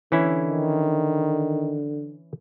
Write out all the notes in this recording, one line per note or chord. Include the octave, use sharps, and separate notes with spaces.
D3 E3 C#4 E4
D#3